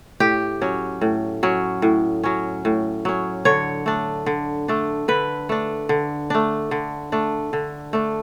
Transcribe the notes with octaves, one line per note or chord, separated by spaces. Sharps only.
A2 G4
F#3 C#4
A2
F#3 C#4
A2
F#3 C#4
A2
F#3 C#4
D3 C#5
A3 D4
D3
A3 D4
D3 B4
A3 D4
D3
A3 D4
D3
A3 D4
D3
A3 D4